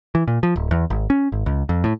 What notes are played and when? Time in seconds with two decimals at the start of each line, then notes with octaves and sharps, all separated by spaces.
0.15 E3
0.28 A#2
0.43 F3
0.56 D1
0.71 E2
0.90 G#1
1.10 C#4
1.32 G#1
1.46 C#2
1.69 F2
1.84 A2